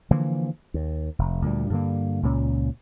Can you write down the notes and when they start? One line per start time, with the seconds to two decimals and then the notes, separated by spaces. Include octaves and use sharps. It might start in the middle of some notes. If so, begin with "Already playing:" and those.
0.11 D3 E3 F3 A#3
0.74 D#2
1.19 F1
1.42 D2 A#2 G3
1.70 G2 D3 A#3
2.23 C#2 A#2 G#3 C#4